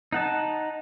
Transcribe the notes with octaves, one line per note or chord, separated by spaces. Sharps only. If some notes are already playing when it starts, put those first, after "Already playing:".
D#4 F#5 A5